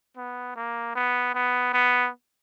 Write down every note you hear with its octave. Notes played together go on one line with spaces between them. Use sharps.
B3
A#3
B3
B3
B3